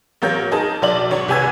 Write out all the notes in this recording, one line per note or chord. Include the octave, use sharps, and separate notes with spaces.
A1 F#3 A#3 C#5 G6
D#4 G#4 A#4 A5
B1 F#3 D5 F#7
G#1 C#5
C2 G4 B4 G#5 E6 G#6